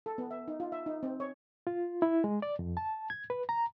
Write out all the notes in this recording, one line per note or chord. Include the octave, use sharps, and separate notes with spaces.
A4
B3
E5
D#4
F4
E5
D#4
C4
C#5
F4
E4
G#3
D5
F2
A5
G#6
B4
A#5